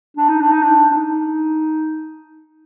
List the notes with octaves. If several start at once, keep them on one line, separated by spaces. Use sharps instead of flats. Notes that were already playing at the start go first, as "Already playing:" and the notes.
D4
D#4
D4
D#4
D4
D4
D#4